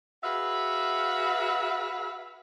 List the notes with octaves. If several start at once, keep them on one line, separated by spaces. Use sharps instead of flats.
F#4 G#4 B4 E5 F5